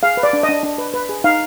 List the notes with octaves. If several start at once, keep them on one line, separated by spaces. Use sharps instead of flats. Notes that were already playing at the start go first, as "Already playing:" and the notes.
G#4 F5
B4
D5
D4
D#5
D4
D4
B4
B4
G#4
D#4 F5